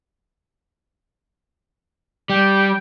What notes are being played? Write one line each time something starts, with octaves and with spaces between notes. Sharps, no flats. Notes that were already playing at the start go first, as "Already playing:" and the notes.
G3 G5